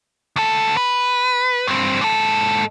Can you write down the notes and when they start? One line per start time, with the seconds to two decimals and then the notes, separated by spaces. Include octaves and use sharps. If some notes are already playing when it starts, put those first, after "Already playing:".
0.36 D2 A4
0.77 B4
1.67 G2 C4
2.01 G#2 A4